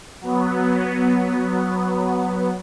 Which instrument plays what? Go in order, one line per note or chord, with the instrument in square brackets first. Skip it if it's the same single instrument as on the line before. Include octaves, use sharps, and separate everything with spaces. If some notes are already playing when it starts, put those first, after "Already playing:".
[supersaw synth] F#3 B3